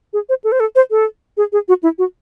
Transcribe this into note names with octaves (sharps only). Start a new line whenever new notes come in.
G#4
C5
A4
C5
A4
C5
A4
G#4
G#4
F#4
E4
F#4